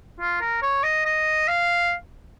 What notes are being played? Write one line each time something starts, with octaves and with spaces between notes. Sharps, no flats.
F4
A#4
C#5
D#5
D#5
F5